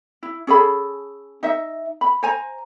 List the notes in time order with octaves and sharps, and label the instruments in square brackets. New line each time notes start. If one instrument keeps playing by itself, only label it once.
[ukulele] E4
C#4 G#4 A4 B5
D#4 D#5 E5
B5
C5 G#5 A#5